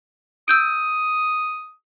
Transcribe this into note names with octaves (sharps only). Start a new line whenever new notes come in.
D#6 E6 G6 D7